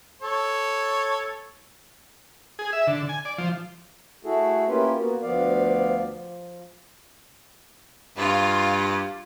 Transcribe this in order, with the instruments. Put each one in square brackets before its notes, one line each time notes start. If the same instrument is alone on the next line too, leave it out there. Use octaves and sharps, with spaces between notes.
[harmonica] A4 C#5
[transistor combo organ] G#4
E5
D3
G#5
D5
F3
[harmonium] A3 E4 F#4 G#4 A4
A#3 C#4 E4 F4 G4 B4
A#3 B3 F#4
D2 F3 B3 D5 F5
F3
[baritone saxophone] G2 [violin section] F4 F5